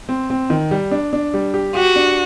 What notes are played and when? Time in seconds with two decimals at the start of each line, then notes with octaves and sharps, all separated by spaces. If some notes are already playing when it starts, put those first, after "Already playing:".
0.09 C4
0.30 C4
0.50 D#3
0.71 G3
0.91 D4
1.13 D4
1.34 G3
1.54 G4
1.75 F#4 G4
1.96 D4